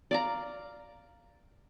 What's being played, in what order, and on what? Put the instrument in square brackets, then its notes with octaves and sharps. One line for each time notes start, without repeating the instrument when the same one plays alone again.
[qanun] D5 F5 A#5